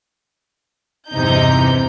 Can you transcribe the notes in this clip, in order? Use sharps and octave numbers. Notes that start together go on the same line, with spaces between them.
E2 G2 C3 E3 D#4 G6